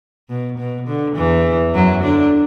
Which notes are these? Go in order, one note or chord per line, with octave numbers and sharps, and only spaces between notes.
B2
B2
D3
E2 E3
F#2 F#3
D3 D4